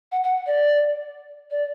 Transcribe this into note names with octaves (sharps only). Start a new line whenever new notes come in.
F#5
F#5
D5
D5